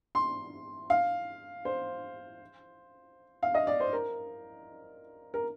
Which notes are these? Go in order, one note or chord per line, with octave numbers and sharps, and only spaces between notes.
C6
F5
C5
F5
D#5
D5
C5
A#4
A#4